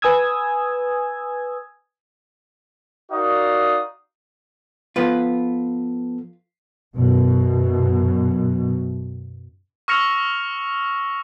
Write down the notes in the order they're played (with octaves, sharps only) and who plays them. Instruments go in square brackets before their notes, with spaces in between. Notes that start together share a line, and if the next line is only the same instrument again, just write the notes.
[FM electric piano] B4 G#5 D#6 E6 G#6
[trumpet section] D#4 F#4 A#4 D5 F5 D#6
[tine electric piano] F3 B3 A4 [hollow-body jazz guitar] F4 B4
[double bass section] F#2 B2
[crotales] C#6 E6 F6 A#6 C#7 F7